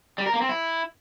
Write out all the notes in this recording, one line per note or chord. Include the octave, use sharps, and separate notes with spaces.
G3
A#4
A#3
C4
E4